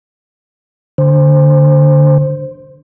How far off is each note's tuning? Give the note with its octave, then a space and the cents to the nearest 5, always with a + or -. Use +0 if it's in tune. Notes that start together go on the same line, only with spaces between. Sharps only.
D3 +0 C5 +0